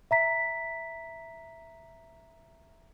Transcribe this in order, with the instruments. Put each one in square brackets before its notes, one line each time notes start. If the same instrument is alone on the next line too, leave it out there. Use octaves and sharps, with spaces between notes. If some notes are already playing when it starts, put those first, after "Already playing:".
[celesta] E5 A#5 B6